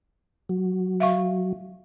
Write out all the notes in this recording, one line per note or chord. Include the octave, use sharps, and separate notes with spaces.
F#3
E5 F5 C#6